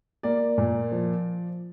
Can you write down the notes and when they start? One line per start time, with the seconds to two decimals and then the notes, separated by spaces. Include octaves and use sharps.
0.23 A#3 D5
0.58 A#2
0.92 F3